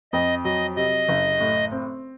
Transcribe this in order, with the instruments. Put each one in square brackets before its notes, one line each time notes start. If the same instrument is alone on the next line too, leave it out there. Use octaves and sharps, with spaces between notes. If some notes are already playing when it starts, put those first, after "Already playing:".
[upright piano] F2 [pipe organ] D#5
[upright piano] F#3 [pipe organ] D#5
[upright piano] C3 [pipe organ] D#5
[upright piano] F#1
A2
C4